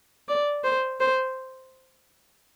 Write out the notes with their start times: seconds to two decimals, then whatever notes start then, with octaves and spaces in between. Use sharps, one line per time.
0.28 D5
0.64 C5
1.00 C5